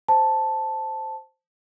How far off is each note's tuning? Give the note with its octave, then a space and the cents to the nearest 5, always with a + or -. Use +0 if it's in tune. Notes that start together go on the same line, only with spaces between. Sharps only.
C5 +0 A5 +0